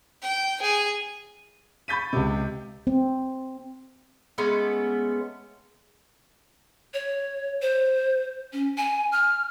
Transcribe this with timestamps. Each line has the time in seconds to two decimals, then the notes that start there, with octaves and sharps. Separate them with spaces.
0.22 G5
0.62 G#4
1.88 B5 C#6 G6 A6 B6 D#7
2.13 C#2 C3
2.87 C4
4.38 G#3 A3 B3 C#4
6.94 C#5
7.62 C5
8.53 C#4
8.78 G#5
9.12 F6